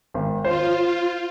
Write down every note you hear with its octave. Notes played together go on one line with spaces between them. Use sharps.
G#1
F4 C5